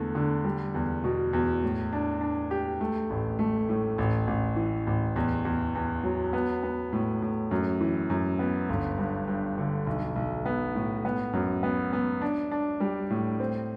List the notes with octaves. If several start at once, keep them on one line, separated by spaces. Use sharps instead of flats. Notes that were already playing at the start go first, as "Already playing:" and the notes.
Already playing: E2 D3 A3
D3
G3
E2
B2
E2
A2
D4
D4
G4
A3
A1
A3
A2
A1
A1
E3
A1
E2
E2
E2
F#3
B3
B3
A2
A2
F#2
E3
F#2
B3
G1
G2
G2
D3
B1
B1
B3
A2
B3
F#2
B3
B3
D4
D4
G3
A2
C4